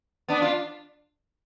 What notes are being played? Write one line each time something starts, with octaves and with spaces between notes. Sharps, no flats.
B3 D4
D4 F4